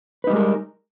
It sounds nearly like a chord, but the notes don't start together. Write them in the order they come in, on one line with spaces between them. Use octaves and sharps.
B4 D#4 G3 G#3 A#4